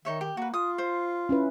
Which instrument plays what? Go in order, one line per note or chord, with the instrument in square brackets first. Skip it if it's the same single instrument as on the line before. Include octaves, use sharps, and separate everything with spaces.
[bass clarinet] D#3 [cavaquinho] D#4 C#5 E5
[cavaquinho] G4
[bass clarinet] A#3 [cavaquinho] F#4 B4
[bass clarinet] F4 [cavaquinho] D#6
[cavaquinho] C5
[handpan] C#4 E4 B4